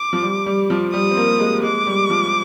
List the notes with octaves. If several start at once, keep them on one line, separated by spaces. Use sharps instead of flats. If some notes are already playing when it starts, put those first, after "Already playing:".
Already playing: D6
F3
G3
G3
F3
G3 D#6
C4
A#3
G#3
G#3 D6
G3
F3